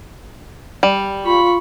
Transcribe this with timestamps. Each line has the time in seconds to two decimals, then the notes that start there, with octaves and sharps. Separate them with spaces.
0.83 G3
1.25 F4 B5 C#6